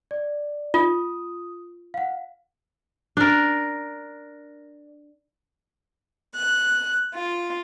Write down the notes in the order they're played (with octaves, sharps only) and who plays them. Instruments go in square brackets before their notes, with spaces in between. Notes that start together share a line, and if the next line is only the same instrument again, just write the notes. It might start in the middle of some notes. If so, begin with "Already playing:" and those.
[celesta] D5
[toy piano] F4 [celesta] D#6
[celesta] F5 F#5
[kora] D4 A#4
[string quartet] F#6
F4